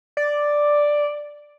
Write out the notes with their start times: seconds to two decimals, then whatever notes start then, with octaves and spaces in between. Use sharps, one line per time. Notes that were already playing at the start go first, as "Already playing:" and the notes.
0.17 D5